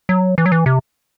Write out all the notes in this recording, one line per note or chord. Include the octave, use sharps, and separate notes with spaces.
F#3
E3
F#3
E3
C3